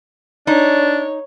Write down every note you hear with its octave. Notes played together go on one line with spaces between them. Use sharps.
D4 D#4 C#5